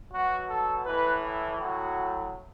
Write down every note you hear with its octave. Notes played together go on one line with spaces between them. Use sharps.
B2 F#3 F#4
A4
A2 E3 B4
E4
A2 F#3 F#4